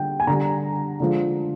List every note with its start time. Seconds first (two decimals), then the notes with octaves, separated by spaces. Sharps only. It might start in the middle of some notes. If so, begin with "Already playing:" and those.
Already playing: D3 G3 G5
0.20 G#5
0.27 D3 G3 A#5
1.00 D3 F3 G#3